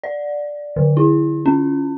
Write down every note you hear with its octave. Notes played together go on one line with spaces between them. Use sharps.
D5
D3
E4
C#4